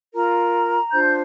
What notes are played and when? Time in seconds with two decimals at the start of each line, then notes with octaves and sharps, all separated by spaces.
0.14 F4 A#4 A#5
0.93 D4 F4 C5 G6